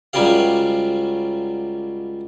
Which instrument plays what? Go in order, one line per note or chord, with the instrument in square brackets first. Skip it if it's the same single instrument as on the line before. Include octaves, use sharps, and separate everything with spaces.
[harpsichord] C#2 F#3 G3 C#4 G4 F5